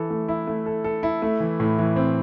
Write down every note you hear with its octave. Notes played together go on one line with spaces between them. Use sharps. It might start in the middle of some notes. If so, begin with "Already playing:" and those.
Already playing: E3 A4
A3
E4
A3
A4
A4
E4
A3
E3
A2
E3
C4